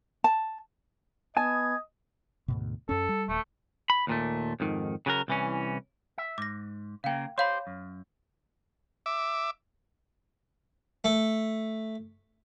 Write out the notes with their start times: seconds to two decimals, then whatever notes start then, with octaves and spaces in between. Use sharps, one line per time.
0.24 A5
1.37 B3 D#5 G#5 A5 G#6
2.48 D2 G#2 B2
2.89 F#2 C#4 A4
3.09 G3
3.29 D#1 A3
3.90 B5
4.07 D#2 A#2 A3
4.60 F2 G#2 D#3
5.06 C#3 F#3 G#4 A#4
5.28 C2 E3 C#4
6.18 E5
6.38 G#2 D6 A#6
7.04 C#3 A#3 F5 G5
7.38 G4 C5 C#5 F5 B5
7.67 F#2
9.06 E5 D6
11.04 A3